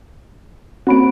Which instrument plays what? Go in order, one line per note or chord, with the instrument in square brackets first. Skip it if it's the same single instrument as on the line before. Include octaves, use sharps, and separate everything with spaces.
[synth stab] A#3 C#4 F#4 [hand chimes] C4 B5 D7